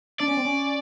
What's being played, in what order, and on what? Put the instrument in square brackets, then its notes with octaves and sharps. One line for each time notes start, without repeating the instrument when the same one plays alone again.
[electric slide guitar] D4 [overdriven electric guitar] D5
[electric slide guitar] C#4
C4
C#4